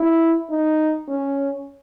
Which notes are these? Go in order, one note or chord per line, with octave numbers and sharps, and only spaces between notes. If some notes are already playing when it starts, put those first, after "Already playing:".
Already playing: E4
D#4
C#4